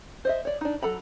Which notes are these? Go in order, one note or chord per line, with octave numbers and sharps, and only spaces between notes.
C5 D#5 E5
C#5 D5
D4 D#4
F#3 A4 A#5 B5